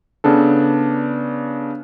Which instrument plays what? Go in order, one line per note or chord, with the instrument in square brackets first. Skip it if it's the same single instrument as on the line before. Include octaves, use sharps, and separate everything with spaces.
[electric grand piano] C#3 B3 D4 A4